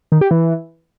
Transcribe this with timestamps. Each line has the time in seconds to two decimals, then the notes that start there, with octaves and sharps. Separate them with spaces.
0.12 D#3
0.21 G4
0.31 E3